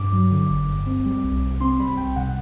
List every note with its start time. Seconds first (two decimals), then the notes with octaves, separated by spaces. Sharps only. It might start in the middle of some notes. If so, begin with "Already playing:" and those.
Already playing: G2 D6
0.13 F#3
0.31 D3
0.50 G1
0.68 G2
0.86 C4
1.05 G3
1.24 C2
1.42 C3
1.61 C4 C6
1.79 G3 B5
1.97 C2 G5
2.16 C3 F#5